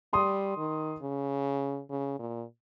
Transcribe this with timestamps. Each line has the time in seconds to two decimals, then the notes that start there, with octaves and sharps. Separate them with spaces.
0.13 G3 C6 D#6
0.57 D#3
1.02 C#3
1.90 C#3
2.19 A#2